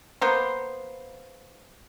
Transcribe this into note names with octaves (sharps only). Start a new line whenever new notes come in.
A#3 B3 C5